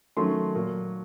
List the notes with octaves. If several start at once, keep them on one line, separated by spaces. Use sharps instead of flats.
D#3 F#3 A3 C#4 C6
A#2 F#3 A#3